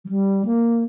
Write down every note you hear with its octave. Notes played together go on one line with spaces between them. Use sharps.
F#3
G3
A#3